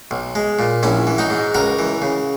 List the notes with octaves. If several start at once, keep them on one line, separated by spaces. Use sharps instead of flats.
B1
G#3
A#2
A#1 C#4 E4
E3
D#4 F#4
G#2
C#2 F#4 A#4
E3
C#3